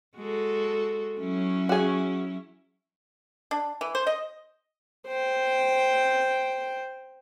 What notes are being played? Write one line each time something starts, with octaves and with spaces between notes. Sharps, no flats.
G#3 F#4 A4
F#3 C#4 E4
F#4 G#4
D4
E3
C5
D#5
C5 G5